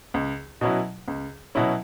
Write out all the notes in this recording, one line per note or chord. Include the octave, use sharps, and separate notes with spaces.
C#2
B2 F#3 C#4 E4
C#2
B2 F#3 C#4 E4